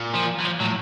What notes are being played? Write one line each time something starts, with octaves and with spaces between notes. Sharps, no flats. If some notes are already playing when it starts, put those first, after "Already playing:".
Already playing: A#2
F3
E3
F3
A2 F#3